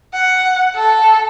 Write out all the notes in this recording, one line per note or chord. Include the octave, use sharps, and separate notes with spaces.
F#5
A4